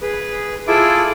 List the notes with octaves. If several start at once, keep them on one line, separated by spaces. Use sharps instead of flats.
G#4 B4
E4 F4 G#4 A4 E5 D6